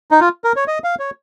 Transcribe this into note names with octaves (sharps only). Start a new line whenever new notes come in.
D#4
F4
A#4
C#5
D#5
F5
C#5